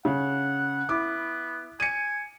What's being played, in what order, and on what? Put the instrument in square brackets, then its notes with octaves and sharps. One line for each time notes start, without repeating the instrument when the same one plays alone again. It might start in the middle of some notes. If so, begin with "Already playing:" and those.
[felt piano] C#3 [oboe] F#5
[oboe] B3 [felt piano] E4 D6
[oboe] G#5 [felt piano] C#7 D#7